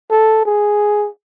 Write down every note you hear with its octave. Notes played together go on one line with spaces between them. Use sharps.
A4
G#4